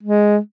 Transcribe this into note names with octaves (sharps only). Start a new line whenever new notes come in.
G#3